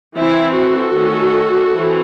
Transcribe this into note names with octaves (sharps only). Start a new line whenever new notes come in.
E3 C4 E4
F#4 A4
D#3 A3 C#4
E3 C4